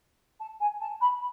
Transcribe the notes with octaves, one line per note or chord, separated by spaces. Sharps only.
A5
G#5
A5
B5